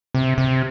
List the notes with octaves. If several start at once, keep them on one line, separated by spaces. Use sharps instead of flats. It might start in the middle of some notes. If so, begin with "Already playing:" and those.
C3
C3